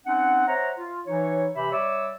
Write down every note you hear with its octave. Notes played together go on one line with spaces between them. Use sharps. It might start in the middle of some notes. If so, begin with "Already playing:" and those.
C4 C#4 D#4 F#5
C5 C#5 E5 F#5 A#5
F4
E3 D#4 C#5
C3 E3 G4 E5 B5
G3 C#5 D5 E5 D6 E6